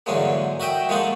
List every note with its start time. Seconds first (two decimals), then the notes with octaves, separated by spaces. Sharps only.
0.06 G#2 D3 E3 F#3 G#3 A#3
0.60 F#4 D#5 E5 G5
0.89 F3 G#3 A#3 D#4 F#4 A4